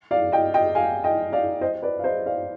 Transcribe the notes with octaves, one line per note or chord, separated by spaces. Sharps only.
D5 F5
D#5 G5
D#5 G5
F5 G#5
D#5 G5
D5 F5
C5 D#5
B4 D5
F5
C5 D#5
D5 F5